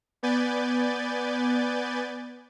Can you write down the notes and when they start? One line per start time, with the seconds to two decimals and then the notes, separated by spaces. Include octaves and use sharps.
0.23 B3 B4 D5 G#5 G6 A6